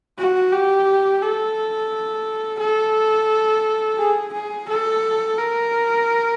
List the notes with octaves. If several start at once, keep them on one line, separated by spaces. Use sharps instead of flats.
F#4
G4
A4
A4
G#4
G#4
A4
A#4